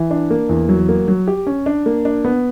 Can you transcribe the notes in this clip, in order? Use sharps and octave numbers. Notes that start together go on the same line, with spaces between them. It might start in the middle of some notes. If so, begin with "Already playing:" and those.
Already playing: E3
D4
A#3
E2
F#3
A#3
F#3
G4
C#4
D4
A#3
D4
B3